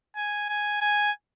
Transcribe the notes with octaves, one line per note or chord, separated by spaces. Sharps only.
G#5
G#5
G#5